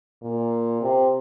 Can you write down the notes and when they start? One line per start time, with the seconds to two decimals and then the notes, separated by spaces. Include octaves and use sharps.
0.22 A#2
0.81 C3